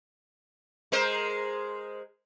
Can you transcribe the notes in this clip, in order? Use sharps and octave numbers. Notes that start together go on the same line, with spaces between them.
G#3 A#4 C5